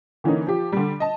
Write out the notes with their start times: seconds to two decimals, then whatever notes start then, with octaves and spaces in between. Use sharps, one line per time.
0.24 D3 E3 A#3 C#4 D#4
0.47 F3 G4
0.72 D3 G3
1.00 D#5 A5